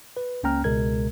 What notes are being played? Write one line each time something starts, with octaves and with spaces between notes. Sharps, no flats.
B4
C#2 A#3 C#4 G5 A#5 F6
C#2 B2 G#3 A#4 G#6